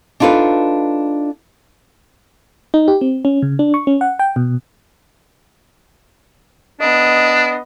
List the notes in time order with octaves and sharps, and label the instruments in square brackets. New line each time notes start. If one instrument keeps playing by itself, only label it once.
[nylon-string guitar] D4 D#4 F4 A4 B4
[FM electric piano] D#4
G4
C4
C#4
C#3
D4
C#6
C#4
F#5
G5
B2
[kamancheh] B3 D#5 [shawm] D4